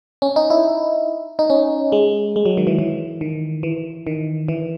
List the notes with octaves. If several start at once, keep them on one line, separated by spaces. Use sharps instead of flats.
C#4
D#4
E4
D#4
C#4
G#3
G#3
F#3
D#3
E3
E3
D#3
E3
D#3
E3